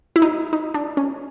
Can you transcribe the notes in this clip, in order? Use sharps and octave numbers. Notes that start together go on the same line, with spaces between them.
E4
D#4
D#4
D4
C#4